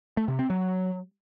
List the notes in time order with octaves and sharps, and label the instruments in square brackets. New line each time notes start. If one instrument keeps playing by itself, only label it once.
[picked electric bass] A3
C3
C4
F#3